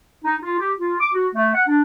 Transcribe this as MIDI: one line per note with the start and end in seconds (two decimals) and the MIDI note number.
0.24 0.36 63
0.42 0.57 65
0.59 0.71 67
0.79 0.95 65
0.99 1.08 86
1.13 1.28 66
1.34 1.52 57
1.54 1.62 78
1.67 1.82 62